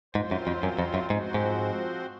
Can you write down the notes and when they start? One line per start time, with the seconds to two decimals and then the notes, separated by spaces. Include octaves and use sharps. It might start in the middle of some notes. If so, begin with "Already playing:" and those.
0.15 G#2 F#3 C4 F4 C5
0.31 F#2
0.47 F2
0.63 F#2
0.79 F2
0.94 F#2
1.10 G#2 F3 C4 F#4 C5
1.34 G#2